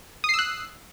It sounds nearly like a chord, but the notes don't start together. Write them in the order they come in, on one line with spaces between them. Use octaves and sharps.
D#6 C7 E6 F#6